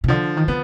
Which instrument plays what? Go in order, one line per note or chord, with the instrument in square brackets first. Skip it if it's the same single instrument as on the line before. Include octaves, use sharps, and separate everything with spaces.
[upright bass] B2
[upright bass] D3 [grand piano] F3
[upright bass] D#3
[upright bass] D3 [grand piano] B3